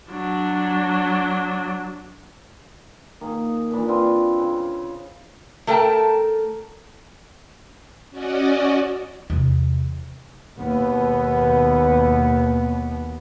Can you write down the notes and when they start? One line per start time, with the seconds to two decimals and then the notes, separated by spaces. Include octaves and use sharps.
0.12 F#3 D4
3.21 D#3 A#3 G#4
3.71 A#2 E3 D4 B5
3.88 C4 F4 B4
4.38 C#3
5.67 A3 A4 A#4 F5 G5 A5
8.10 C#4 F#4 D5 D#5
9.30 E2 C3
10.57 D#2 B2 B3